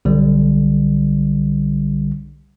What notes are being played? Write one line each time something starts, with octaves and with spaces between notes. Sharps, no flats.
B1 D3 G3